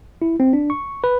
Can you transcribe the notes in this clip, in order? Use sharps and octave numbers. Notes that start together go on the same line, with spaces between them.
E4
C4
D4
C#6
B4